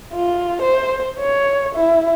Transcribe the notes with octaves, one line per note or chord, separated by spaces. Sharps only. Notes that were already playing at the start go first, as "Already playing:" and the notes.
F4
C5
C#5
E4